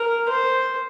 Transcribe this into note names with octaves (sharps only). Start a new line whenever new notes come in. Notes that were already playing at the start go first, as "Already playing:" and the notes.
Already playing: A#4
C5